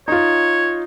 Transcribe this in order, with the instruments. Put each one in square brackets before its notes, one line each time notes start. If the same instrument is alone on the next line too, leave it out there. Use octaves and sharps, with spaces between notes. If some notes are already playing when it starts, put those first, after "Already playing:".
[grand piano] D#4 F4 [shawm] C#5